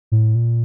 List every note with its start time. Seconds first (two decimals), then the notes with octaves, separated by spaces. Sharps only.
0.12 A2
0.35 A#2